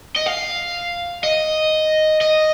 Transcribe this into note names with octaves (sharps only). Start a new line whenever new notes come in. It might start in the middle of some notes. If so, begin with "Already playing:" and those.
D#5
F5
D#5
D#5